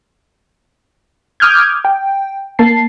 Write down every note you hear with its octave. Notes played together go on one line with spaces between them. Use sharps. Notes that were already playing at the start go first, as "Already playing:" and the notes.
D6 D#6 F6 G6 G#6
G5
A#3 A5 C7